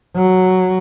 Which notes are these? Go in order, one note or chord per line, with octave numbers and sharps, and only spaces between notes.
F#3